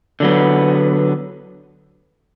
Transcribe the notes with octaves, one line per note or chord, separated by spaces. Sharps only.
D3 F#3 B3